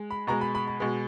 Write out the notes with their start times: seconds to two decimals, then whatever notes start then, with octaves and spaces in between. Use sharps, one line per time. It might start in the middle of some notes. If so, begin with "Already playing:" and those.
Already playing: G#3
0.11 B5
0.27 B2 G#3 A#5
0.41 B5
0.55 B5
0.68 B5
0.80 B2 G#3